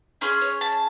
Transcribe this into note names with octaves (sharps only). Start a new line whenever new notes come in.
C#4 G#4 C6
C#5
A5